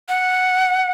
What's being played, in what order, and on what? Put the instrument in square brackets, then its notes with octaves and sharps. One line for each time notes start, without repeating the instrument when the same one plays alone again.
[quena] F#5